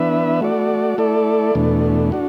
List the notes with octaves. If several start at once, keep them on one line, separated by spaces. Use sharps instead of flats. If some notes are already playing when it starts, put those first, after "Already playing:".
Already playing: E3 B3 D4 B4 E5
A3 F#4 D5
A3 E4 A4 D5
E2 B2 A3 D4
D4 F#4